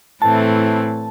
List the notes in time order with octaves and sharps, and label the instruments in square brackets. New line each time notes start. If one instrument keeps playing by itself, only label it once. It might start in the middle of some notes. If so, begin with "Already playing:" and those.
[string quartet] A2 E3 A3 C4 [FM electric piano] A5